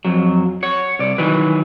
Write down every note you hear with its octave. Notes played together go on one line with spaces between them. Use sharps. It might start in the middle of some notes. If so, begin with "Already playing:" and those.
F2 F#3
C#5 F#5
C2 D5
D#3 E3 F#3 B4